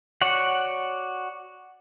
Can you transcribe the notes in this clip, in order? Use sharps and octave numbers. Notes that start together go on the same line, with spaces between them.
F#4 C#5 D5 F#5